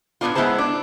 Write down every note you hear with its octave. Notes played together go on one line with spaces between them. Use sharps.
A#2 D3 B3 D4 F4
G#3 B3 E4 G#4 C5 A5
D4